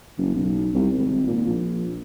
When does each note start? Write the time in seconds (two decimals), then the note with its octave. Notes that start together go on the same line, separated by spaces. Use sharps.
0.18 F#1
0.34 B1
0.75 C2
0.99 G#1
1.27 A#2
1.47 A#1